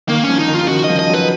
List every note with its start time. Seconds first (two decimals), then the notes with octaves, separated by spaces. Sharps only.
0.08 D#3 A#3
0.23 C#4
0.29 F3
0.39 D#4
0.48 D#3
0.54 F4
0.60 C#3
0.68 D#3 F#4
0.84 F3 D#5
0.99 D#5
1.09 F#3
1.14 B4